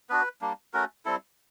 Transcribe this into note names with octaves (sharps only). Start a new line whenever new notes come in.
B3 D4 F#4 B4
G3 A#3 D4
A3 C#4 F#4 A#4
G3 C4 E4 A4